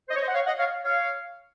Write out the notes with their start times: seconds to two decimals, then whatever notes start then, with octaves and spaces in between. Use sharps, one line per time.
0.09 C5 D#5
0.16 C#5
0.22 C5 D#5
0.28 F#5
0.34 C#5 F5
0.47 D#5 F#5
0.58 C#5 F5
0.84 C#5 F5